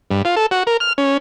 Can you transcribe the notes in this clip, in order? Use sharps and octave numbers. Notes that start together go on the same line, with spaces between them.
G2
F4
A4
F#4
A#4
F6
C#4